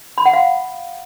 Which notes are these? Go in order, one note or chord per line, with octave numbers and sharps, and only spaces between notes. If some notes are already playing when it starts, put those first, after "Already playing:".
B5
F#5
F5